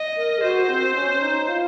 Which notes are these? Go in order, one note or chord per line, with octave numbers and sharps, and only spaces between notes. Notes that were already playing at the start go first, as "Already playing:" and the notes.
Already playing: D#5
A#4
G#4
F#4 C5
C4
C#4
D#4
F4